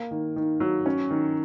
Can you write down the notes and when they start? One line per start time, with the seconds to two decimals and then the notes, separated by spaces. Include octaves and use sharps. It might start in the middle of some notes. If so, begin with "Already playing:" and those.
Already playing: A#3
0.11 D#3
0.36 D#3
0.60 F#3
0.86 C#4
1.10 D#3